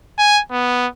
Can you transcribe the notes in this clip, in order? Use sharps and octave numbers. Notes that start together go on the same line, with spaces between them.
G#5
B3